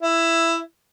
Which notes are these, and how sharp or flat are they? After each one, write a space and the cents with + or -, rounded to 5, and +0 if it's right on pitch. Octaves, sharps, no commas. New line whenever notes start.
E4 +10